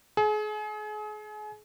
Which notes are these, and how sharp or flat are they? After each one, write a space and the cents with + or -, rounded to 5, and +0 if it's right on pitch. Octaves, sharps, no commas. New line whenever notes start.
G#4 +35